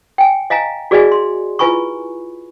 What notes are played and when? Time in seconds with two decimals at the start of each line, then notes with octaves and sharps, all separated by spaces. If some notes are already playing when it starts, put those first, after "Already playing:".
0.18 G5 G#5
0.50 D#5 F5 G#5 A#5
0.91 F#4 G#4 D5 D#5 F5 G#5
1.12 C6
1.59 E4 F4 B4 G#5 B5 C#6